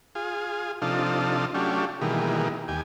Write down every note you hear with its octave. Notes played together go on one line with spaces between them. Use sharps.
F4 G#4
C3 F3 D4 D#4 F4 A4
F#3 A3 C#4 D4 F4 G4
B2 D#3 E3 G3 G#3 A#3
D#2 G4 G#5